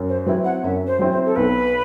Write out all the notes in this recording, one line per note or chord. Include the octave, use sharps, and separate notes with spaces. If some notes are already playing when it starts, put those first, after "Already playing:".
Already playing: F#2
C5
F#3 C4 E4 B4
F#5
F#2 E5
C5
F#3 C4 E4
C5
A4
B1 B4